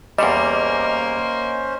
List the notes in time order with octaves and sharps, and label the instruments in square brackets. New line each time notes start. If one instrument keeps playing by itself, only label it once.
[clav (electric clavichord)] E2 G3 [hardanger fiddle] A#3 [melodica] C#4 C5 [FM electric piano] D#5